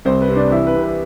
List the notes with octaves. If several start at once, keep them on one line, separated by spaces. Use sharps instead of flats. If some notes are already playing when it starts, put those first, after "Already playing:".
C2 C4 C5
B4
C3
D4 D5
E3 E4 E5
B4
C3
B4